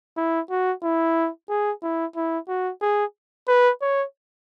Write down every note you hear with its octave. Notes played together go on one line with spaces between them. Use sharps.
E4
F#4
E4
G#4
E4
E4
F#4
G#4
B4
C#5